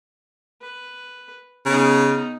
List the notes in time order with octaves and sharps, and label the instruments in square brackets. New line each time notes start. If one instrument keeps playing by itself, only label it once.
[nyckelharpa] B4
[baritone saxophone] C#3 [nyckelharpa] B3 D#4